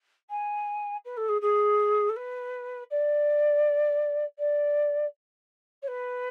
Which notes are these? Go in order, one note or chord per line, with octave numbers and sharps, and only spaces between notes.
G#5
B4
A4
G#4
G#4
A4
B4
D5
D5
C#5
B4